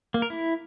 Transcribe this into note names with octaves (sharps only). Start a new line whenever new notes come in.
A#3
A#4
E4